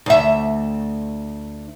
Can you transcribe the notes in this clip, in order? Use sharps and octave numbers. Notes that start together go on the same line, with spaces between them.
D2 E5